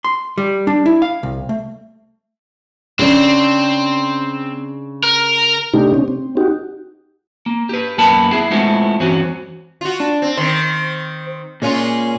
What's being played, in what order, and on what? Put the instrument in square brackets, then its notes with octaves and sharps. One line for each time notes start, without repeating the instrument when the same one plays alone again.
[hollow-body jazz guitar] C6
G3
D4
E4
F5
C2
A3
[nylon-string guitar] C#3 D4 [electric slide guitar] C4
[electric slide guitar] A#4
[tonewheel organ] C3 A3 D4 D#4 G4
C4 C#4
C4
D#4 F#4 G4
[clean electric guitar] A#3
G4 B4
F#2 A#3 B3 B4 A5 B5
E4 G#4
G#3 A3 B3 C4 E4 F4
E2 G2 C4 C#4 F#4
[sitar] F4 F#4
[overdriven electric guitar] D4
[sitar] C4
[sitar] D#3 C4 [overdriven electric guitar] C5
[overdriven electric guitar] A#2 [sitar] G#3 C#4 F4